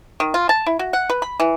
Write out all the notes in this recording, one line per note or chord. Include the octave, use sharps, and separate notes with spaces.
D#3
F4
A5
E4
F#4
F#5
B4
B5
E3